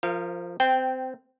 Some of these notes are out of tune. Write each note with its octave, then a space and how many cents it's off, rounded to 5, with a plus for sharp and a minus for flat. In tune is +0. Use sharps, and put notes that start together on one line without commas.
F3 +0 A#4 -20 F5 -35
C4 -20 G5 +0